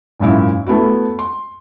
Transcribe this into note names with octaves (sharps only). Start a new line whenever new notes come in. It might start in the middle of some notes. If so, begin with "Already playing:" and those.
G#1 F#2 A#2 E4
A3 B3 E4 F#4
C6